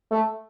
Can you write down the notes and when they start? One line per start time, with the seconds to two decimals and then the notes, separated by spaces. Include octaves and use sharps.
0.11 A3